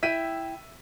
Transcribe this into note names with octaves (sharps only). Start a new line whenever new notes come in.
E4 E5 G5 B6 D#7